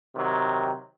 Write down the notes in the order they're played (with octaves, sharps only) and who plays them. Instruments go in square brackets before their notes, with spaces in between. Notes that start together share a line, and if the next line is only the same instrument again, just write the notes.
[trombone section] C3 D#3 F#3